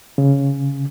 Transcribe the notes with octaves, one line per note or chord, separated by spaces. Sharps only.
C#3